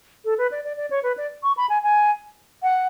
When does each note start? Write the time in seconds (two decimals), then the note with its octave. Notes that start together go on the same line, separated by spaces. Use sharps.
0.25 A4
0.38 B4
0.51 D5
0.64 D5
0.77 D5
0.90 C#5
1.03 B4
1.17 D5
1.43 C#6
1.57 B5
1.69 G#5
1.83 G#5
2.63 F#5